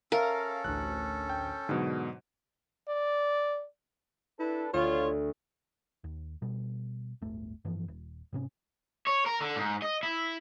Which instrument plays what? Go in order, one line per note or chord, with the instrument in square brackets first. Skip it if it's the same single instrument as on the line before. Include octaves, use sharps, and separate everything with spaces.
[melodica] C#4 A4 [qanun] A#4 [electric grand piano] E5 F5
[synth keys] A1 D2 [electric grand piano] F#6
[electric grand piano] G5
[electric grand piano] G#2 B2 [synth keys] D3 F#3
[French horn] D5
[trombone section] D4 A4 B4 [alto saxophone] E4
[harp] D2 [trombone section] F4 [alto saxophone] C#5
[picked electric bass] D#2
B2 G3
D1 G1 A3
G2 E3 F3
D#1
G#2 C3 C#4
[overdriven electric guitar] C#5
A#4
D3
G#2
D#5
E4